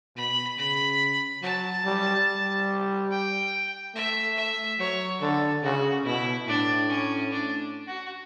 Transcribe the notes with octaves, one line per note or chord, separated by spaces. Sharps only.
B2 B5
C#3 B5
F#3 A5
G3
G3
G5
A3 E5
E5
F#3 C#5
D3 A4
C#3 F#4
B2 E4
A2 D4
C#4
D4
F#4